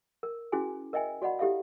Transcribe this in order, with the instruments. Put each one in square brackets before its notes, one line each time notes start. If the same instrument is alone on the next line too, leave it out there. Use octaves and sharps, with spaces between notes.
[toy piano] A#4
C#4 E4 F#4 G#4 G#5
A#4 D#5 E5 G5 G#5
F#4 D5 D#5 F#5 B5
E4 G4 A4 E5 F5